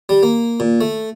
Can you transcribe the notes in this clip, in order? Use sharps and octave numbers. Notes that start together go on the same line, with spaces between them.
G3
A#3
A#2
A3